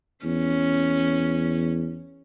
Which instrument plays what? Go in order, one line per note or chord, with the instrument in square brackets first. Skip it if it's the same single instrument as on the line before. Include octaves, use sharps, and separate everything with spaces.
[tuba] E2 [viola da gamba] C#4